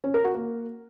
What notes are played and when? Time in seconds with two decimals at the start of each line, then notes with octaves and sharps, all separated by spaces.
0.04 C#4
0.14 A#4
0.24 F#4
0.35 A#3